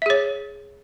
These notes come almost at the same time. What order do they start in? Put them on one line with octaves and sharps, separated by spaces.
E5 G#4 C#5